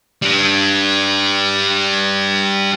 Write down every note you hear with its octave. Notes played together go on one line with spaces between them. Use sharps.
G3 D4